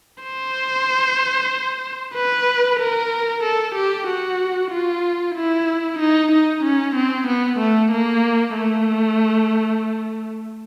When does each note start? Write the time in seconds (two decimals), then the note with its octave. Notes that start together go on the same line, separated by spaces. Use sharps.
0.24 C5
2.15 B4
2.80 A#4
3.44 A4
3.75 G4
4.07 F#4
4.71 F4
5.36 E4
5.99 D#4
6.32 D#4
6.64 C#4
6.96 C4
7.27 B3
7.59 A3
7.92 A#3
8.55 A3